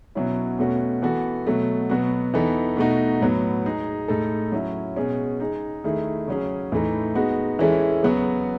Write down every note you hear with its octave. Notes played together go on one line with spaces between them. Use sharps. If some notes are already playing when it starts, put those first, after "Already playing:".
B2 F#3 C#4 E4
B2 A3 C#4 F#4
E3 B3 F#4 A4
B2 F#3 A3
B2 F#3 B3 F#4
E3 B3 D#4 A4
B2 A3 D#4 F#4
A2 F#3 B3
G#3 D#4 G#4
A2 G#3 D#4 A4
F#3 C#4 E4
B2 G#3 C#4 G#4
G#3 D#4 G#4
D#3 A3 E4 G#4
C#3 F#3 C#4 G#4
A2 E3 A3 D#4
G#3 B3 D#4 F#4
E3 G#3 C#4 E4 A4
C#3 F#3 B3 F#4